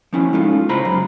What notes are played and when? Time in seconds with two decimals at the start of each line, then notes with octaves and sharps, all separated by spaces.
0.13 F3 C#4 E4
0.33 G#3 A3 D#4 F4
0.69 A2 C#3 C5 A#5 B5
0.85 F#2